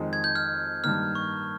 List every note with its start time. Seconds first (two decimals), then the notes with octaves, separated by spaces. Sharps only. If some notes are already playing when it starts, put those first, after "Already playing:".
Already playing: F2 D#3 G#3
0.13 G#6
0.24 G6
0.35 F6
0.84 G2 D#3 A#3 F6
1.15 C#6